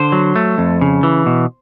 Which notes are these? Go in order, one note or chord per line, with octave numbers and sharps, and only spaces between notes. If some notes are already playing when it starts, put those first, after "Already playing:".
Already playing: D3 C5
F#3
A3
F2
C#3
E3
B2